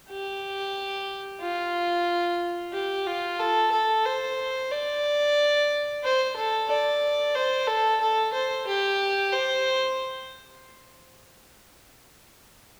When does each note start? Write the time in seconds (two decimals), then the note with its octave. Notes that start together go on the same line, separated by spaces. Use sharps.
0.09 G4
1.41 F4
2.73 G4
3.07 F4
3.39 A4
3.72 A4
4.06 C5
4.71 D5
6.04 C5
6.36 A4
6.69 D5
7.35 C5
7.67 A4
8.01 A4
8.33 C5
8.67 G4
9.32 C5